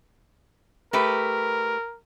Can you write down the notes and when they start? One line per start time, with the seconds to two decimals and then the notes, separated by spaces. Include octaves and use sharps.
0.93 A3 G4 A#4 B4